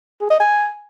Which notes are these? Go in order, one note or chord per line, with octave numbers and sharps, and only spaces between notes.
G#4
D#5
G#5